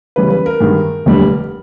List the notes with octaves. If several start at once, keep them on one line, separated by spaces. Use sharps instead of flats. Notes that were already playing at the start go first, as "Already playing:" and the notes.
E2 C#3 E3 G3 B4
B4
A#4
G2 D#3 G#3 B3
F1 D#2 D3 G3